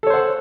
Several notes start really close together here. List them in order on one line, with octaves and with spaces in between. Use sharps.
A4 C#5 C5 F#5